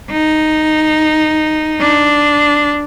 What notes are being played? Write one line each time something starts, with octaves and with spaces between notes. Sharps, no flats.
D#4
D4